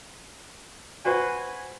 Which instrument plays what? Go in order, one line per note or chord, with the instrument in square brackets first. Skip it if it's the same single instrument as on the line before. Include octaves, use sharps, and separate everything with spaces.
[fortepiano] F#4 B4 C5 [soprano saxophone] G#5